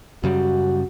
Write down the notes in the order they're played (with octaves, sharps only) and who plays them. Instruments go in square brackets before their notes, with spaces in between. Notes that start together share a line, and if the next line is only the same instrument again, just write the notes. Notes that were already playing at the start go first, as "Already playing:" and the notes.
[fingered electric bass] F#2 C#3 G3 [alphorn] F#4